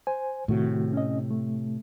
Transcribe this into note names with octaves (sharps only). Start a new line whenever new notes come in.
C5 G#5
A2 C3 D#3 A3 F#4
C#4 D#5
A3